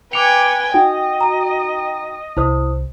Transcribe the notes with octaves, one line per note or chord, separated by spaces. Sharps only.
B4 G5 G#5 D6 C#7 F7
D#4 F#4 D#5 G5
A#5
C2 E4 C5 D#6